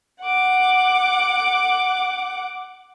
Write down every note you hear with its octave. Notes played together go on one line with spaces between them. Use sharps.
F#5 D6